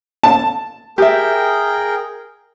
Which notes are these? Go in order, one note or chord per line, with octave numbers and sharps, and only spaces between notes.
A5
G4 G#4 A#4 E5 G5